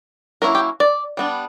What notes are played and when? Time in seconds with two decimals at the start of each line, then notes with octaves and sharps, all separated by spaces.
0.42 F#3 A#3 C#4 E4 A#4
0.55 G4
0.80 D5
1.17 G3 B3 D4